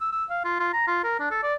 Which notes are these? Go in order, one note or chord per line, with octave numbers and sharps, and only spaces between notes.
E6
E6
F5
F4
F4
A#5
F4
A#4
D4
A4
D5